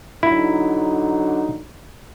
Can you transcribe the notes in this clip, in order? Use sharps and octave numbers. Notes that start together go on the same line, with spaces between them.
D3 F#3 D#4 E4